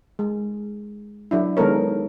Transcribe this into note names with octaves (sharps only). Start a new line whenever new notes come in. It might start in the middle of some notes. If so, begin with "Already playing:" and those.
G#3
F#3 D4 E4
D#3 G#3 B3 A4 A#4 C#5